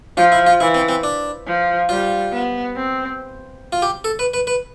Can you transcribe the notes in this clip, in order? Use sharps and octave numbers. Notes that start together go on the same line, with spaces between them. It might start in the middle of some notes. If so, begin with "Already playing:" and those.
F3 F4
E4
F4
E3 E4
C4
C4
D4
F3
G3 F4
B3
C4
F4
G4
A4
B4
B4
B4